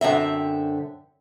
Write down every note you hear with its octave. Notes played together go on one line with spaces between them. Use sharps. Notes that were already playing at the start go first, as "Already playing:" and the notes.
F#2 D3 C4 E5